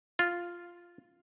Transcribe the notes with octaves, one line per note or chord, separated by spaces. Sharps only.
F4